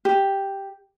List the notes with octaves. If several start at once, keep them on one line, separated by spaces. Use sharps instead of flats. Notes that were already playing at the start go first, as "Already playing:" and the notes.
G4